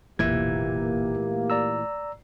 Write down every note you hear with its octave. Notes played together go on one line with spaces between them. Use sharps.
F1 B1 A#2 E3 A#3 G4 E5 G#6
A3
D5 A#5 E6